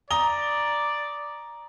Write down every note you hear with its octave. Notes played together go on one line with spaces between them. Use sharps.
D5 A#5 D#6 G7